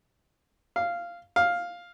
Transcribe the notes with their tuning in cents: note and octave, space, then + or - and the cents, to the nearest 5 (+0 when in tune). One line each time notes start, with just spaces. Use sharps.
F5 -10
F5 +5